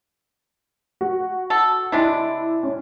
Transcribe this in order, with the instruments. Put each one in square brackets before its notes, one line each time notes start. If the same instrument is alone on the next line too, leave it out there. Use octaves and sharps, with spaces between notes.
[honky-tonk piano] F#4
[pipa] A4
[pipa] C3 G#3 D4 [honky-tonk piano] E4
[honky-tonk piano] C#4